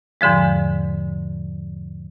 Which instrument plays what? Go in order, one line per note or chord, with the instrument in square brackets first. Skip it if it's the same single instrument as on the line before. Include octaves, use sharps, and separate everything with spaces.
[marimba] E2 G#2 D3 F3 G#3